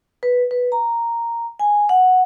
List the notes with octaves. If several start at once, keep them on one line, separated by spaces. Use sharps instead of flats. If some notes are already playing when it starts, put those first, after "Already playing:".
B4
B4
A#5
G#5
F#5